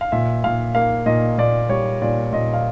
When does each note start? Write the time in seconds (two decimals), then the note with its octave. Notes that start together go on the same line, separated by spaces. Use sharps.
0.01 F5
0.12 A#2 E5
0.44 A#2 F5
0.75 A#3 F5
1.06 A#2 D#5
1.38 A#2 D5
1.69 G3 C#5
2.02 A#2 D5
2.33 A#2 D#5
2.53 F5